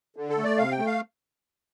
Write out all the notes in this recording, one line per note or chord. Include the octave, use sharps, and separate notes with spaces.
D3
A4
A3
D5
C3 F5
G5
A3
F5